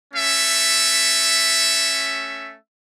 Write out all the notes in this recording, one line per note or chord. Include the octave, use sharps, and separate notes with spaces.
A3 C#4 E5